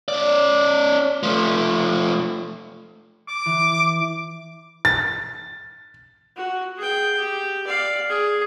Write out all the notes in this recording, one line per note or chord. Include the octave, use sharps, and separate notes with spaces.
C#4 D5
F3 A3
D6
E3
A6
F#4
G#4 G5
G4
D5 F5
G#4